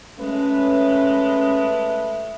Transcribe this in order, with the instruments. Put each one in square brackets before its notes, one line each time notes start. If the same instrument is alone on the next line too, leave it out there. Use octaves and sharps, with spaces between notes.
[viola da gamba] G#3 [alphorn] A3 [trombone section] C#4 [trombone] B4